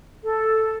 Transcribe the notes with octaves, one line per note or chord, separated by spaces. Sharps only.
A4